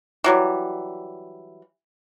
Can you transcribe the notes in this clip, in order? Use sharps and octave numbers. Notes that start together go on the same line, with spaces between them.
E3 F#3 G3